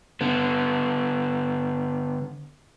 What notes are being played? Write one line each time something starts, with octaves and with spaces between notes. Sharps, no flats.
D3 B3